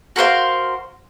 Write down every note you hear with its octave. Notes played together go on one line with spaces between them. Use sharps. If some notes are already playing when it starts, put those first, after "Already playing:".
F#4 A#4 C5 F5